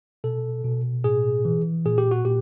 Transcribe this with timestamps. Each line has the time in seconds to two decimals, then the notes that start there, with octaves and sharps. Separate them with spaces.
0.24 B2 A4
0.65 B2
1.04 A2 G#4
1.45 E3
1.86 A#2 G#4
1.98 G4
2.11 F#4
2.25 A#2 G4